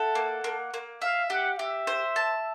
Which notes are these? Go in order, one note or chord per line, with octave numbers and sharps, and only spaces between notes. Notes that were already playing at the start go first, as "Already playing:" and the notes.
Already playing: E4 A4 F#5
A#3
A#3
A#3
E5 F5
G4 F#5
G4 E5
C5
A5